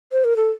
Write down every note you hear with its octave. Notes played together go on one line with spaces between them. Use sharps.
C5
A#4
A4